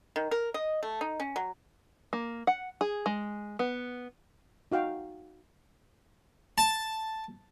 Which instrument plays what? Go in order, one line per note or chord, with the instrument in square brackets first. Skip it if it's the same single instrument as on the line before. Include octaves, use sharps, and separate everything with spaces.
[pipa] D#3
A#4
D#5
A3
D#4
C#4
F#3
[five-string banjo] A#3
F#5
G#4
G#3
B3
[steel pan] D#4 F#4 F5 G5
[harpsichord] A5